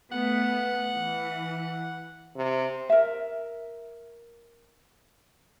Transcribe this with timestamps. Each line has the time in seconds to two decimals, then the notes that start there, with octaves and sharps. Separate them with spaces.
0.12 A3 B3 F#5
0.94 E3
2.36 C3
2.90 A#4 E5